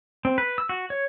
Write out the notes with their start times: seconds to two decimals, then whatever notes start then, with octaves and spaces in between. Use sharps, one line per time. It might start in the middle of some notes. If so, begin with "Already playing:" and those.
0.25 C4
0.38 B4
0.58 E6
0.69 F#4
0.90 C#5